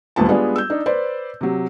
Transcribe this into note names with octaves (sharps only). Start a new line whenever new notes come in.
D#1 G#1 D2 B3 F4 A5
G3 G#3 B3 D4 F4 G#4
E6 G6
D4 D#4
B4 C5 D5
C3 F#3